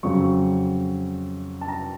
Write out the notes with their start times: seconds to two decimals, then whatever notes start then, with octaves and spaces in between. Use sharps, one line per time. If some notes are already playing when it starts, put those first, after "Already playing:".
0.03 F2 C#3 F#3 C#6
1.61 A5
1.68 A#5